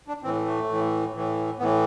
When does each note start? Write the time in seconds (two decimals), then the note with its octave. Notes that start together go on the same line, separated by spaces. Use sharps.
0.08 D4
0.23 A2 E3 C4
0.46 A3
0.69 A2 E3
1.14 A2 E3
1.59 A2 E3 B3